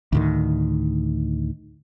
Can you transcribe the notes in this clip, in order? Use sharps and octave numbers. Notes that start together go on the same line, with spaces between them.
D2 A2 D#3